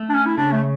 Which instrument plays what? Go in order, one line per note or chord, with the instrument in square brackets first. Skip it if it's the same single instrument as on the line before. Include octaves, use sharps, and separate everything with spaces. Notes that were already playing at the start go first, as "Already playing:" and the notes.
Already playing: [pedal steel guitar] A3
[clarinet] D4
C#4
E4
[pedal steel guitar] C#3 [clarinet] D4
[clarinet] A3